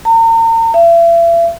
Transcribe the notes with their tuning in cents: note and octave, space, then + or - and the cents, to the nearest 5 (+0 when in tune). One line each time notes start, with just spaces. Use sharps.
A#5 -40
E5 +40